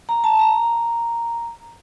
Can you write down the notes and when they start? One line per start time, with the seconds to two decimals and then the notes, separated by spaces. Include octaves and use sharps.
0.09 A#5
0.24 A5
0.39 A#5